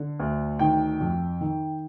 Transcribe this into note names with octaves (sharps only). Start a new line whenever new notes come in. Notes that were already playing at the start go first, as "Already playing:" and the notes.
Already playing: D3
D2
D#3 G5
F2
D#3